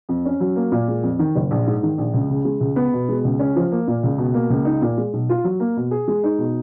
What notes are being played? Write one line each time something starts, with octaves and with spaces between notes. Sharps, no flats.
F2
C#4
F#3
A#3
A#2
G#3
F2
D#3
F#1
A#1
G#2
D#3
A#1
C#2
C#3
G#3
C#2
B3
B2
G#3
C#2
C#4
F3
A#3
A#2
C#2
B2
A#3
C#2
D#4
A#2
G#3
B1
F4
F#3
A#3
B2
G#4
G#3
D#4
B2